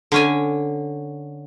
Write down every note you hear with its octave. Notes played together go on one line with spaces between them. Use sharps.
D3 C#4 G#5